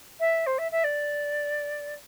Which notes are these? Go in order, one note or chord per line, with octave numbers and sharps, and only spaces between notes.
E5
C5
E5
E5
D5